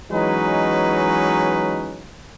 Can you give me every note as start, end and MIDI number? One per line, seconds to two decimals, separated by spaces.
0.11 2.04 52
0.11 2.04 54
0.11 2.04 56
0.11 2.04 61
0.11 2.04 63
0.11 2.04 71